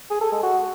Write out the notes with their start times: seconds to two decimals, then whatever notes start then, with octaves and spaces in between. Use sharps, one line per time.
0.10 G#4
0.21 A4
0.32 G#3
0.43 F#4